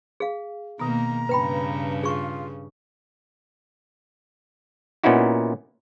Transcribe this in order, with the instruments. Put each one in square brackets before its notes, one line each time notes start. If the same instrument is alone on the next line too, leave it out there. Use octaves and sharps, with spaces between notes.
[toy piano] G#4 F5
[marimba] B2 B3 [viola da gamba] D#3 A#3 [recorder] A#5
[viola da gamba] G2 C#3 [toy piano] B4 G5 B5
[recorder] F4 [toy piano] G#4 C#6
[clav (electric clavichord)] A#2 B3 C#4 D#4 E4 F#4